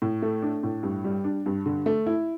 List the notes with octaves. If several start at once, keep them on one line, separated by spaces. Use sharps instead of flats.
A2
A3
D4
A2
G2
G3
D4
G2
D3
A3
E4